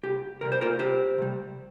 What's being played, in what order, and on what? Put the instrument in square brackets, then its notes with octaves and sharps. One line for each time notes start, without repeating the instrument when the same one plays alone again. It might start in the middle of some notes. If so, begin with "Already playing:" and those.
[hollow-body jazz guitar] C2 G4
C3 G3 A#4
C5
F4 A#4
C2 G4 C5
C3 G3